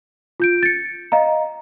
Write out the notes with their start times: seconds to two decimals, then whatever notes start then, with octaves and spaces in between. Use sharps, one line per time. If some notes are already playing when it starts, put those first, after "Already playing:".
0.40 F4 G6 D7
0.63 A6 C#7
1.12 D#5 F5 A#5